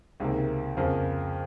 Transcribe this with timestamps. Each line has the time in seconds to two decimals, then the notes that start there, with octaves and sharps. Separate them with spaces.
0.20 C#2 C3 D#3 A#3
0.77 F2 C#3 F3 A#3